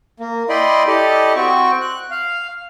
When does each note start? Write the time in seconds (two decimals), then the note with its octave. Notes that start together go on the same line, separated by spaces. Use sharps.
0.20 A#3
0.49 E4 D5 D#5 G5 B5 C6
0.87 E4 G4 A4 D5 D#5
1.36 C4 F#4 G5 C#6
1.81 F#6
2.11 F5